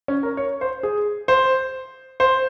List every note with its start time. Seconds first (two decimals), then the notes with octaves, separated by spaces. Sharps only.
0.08 C#4
0.23 A#4
0.37 C#5
0.61 C5
0.83 G#4
1.28 C5
2.20 C5